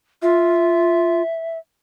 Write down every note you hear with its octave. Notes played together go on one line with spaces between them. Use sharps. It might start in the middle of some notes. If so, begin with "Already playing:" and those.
F4 E5